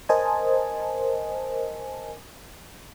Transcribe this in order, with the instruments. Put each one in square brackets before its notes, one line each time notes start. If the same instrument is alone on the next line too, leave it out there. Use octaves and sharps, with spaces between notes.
[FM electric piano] A#4 C5 D#5 G#5 A5